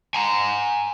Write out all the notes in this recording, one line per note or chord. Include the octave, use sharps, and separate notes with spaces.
G#5 A#5